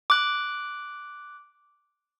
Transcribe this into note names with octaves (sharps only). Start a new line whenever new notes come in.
D6 F#6